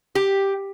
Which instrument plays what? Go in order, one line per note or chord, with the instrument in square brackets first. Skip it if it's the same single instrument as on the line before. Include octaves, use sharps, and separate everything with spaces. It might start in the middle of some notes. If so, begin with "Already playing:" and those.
[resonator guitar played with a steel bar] G4